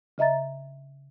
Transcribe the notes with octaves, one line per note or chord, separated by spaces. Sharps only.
C#3 D#5 E5 A#5 A6